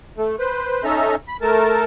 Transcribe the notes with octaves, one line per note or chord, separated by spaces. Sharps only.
A3
B4 C5
C#4 D#4 A4 E5 A#5
B5
A3 A#4 A5